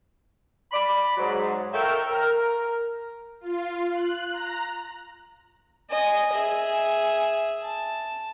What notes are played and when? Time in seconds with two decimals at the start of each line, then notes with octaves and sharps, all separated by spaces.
0.72 D5 B5
1.17 G#2 F#3
1.73 A4 A#4 C#5 E5 F5 G5
2.10 A#4
3.41 F4
3.93 F#6
4.33 A#5
5.90 D#5 G#5
6.33 G#4 E5
7.63 A5